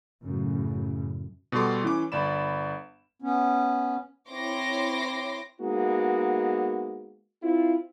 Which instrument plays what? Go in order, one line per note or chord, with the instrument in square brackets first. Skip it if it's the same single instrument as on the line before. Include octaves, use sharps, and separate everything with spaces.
[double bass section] F#2 A2 C#3
[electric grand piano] B2 G3 A4 C6 D6
E3 C#4 D6
G1 D5 B5 E7
[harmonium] B3 C#4
[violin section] C4 E4 C#5 C6 D6 A#6
[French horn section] G#3 A#3 B3 D#4 F#4
C4 E4 F4